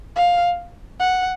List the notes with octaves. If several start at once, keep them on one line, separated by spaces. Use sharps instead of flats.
F5
F#5